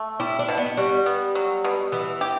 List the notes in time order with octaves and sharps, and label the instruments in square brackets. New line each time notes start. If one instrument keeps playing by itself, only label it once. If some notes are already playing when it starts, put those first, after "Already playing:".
Already playing: [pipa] A3
[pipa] G3 [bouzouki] E4
[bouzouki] D4
[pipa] B2
[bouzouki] B3
[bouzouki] G3 [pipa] F#4
[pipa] B3
F#3
B2
[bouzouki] E3 [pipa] B3
[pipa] G4